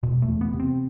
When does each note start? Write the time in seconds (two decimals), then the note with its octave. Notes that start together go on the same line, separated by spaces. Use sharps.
0.03 E1 B2
0.22 A3
0.28 E2
0.41 B3
0.53 C3
0.60 C4